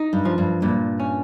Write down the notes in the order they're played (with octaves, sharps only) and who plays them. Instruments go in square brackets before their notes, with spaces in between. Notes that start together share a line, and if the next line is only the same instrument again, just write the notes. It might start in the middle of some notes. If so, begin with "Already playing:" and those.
Already playing: [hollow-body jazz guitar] D#4
[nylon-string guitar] G2
[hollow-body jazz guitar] F3
[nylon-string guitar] G2
[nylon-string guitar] G2 [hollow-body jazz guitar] A#2
[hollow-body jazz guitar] C#4